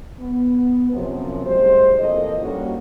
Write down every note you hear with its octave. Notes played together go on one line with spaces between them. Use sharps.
B3
F#2 C3 F3
A2 G3 G#3 C5
F2 E3 A#3 A4 D#5
G3 A#3 C#4 D4 F#4